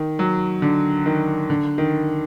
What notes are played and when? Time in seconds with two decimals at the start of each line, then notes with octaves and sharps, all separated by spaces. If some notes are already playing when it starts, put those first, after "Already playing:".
Already playing: D#3
0.19 F#3
0.62 D3
1.06 D#3
1.50 D3
1.78 D#3